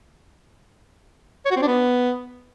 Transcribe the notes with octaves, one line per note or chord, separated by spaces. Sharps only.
C#5
F#4
C4
D4
B3